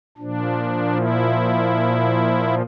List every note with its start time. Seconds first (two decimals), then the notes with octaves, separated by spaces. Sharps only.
0.18 A#2 F3 D4
0.94 E4